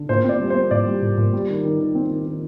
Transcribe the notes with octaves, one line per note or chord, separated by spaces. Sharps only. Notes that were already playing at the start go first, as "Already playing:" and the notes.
Already playing: D3
A#2 C5
C4 D5
G3
C5
C4
A#2 D5
G3
A#2
A#2
G3
D#3
D#3
D#3
C4
D#3
D#3